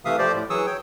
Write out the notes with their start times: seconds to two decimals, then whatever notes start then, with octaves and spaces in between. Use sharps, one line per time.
0.05 C3 E3 A3 E5 F5 D#6
0.18 F3 A3 G4 C5 D5
0.34 A2
0.50 E3 F#3 G#4 C#6 D#6 E6
0.66 C#5 G5